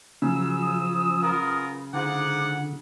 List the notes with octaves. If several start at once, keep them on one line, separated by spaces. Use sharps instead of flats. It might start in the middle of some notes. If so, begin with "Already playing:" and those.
C#3 F3 F#3 E6
D#6
B3 F4 A#4
G#2 D3 F4 F#5 D6